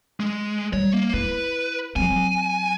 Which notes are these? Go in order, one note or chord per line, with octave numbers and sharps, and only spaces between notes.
G#3
G3 C#5
A#3
E4 B4
F#3 C4 G#5